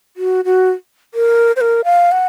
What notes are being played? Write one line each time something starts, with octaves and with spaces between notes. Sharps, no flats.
F#4
F#4
A#4
C5
A#4
F5
F#5